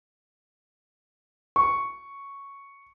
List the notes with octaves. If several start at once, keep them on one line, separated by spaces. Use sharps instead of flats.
C#6